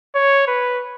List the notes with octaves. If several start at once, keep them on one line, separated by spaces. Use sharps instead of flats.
C#5
B4